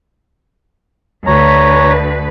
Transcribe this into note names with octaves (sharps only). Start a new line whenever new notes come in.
D2 B4 C#5 A#5